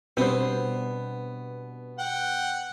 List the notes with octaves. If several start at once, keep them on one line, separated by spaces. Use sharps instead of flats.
B2 G3 B3 C4 D4 C5
F#5 G5